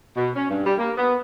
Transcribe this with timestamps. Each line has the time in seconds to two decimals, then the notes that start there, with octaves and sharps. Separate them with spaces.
0.16 B2
0.35 C#4
0.49 G2
0.66 G3
0.78 A#3
0.97 B3